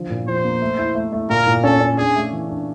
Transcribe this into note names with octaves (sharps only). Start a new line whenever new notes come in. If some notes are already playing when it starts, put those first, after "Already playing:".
Already playing: D3 F3
A#2
F3 C5
A#3
A3
E4
A3
A3
A#2 A#4
A#2
C#4 A4
C#4
D4 G#4
A3
E3
D4